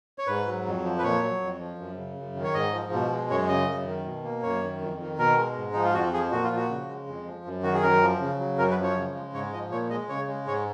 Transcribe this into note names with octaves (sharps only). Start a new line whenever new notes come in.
C#5
G#2 B4
F#3
F2
F3
B4
A#2 C#5
F#3
F2
F3
F#2
C#3
F#2
D#3
C#5
G#2 D#5
F3
B2
G#3
F#2 C#5
C#3 D#5
F#2
D#3
B2
A#3
F#2 C#5
D#3
F2
D#3
B2 A#4
G#3
G#2
F3 D#4
F4
F2 F#4
F3 G#4
A#2 F#4
F4
F3
F#4
C#3
G#3
F2
F3
F#2
D#3 F#4
G#4
F#2 A#4
F3
C#3
F#3
F#2 A#4
B4
F3
C#5
C#3
G#3
G#2 C#5
F3 D#5
A#2 C#5
G#3 D#5
C#3 C#5
G#3
G#2 C#5